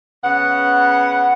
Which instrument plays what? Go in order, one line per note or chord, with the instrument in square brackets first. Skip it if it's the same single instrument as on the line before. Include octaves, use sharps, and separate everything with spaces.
[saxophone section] C#3 B3 F#5